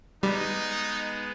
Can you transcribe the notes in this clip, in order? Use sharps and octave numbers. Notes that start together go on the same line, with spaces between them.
G3 G#3 B3 D#4